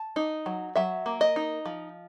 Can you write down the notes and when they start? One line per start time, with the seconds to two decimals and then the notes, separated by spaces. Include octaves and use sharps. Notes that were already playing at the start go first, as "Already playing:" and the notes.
Already playing: A5
0.16 D#4
0.46 F#3
0.76 F#3 E5
1.06 A#3
1.21 D#5
1.36 D#4
1.66 F3